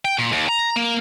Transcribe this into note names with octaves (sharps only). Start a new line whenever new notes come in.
G5
A#2
D#2
A#5
A#3